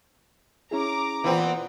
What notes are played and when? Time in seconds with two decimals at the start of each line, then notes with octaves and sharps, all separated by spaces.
0.71 C#4 E4 G#4 A#5 D6
1.24 A#2 E3 B3 C4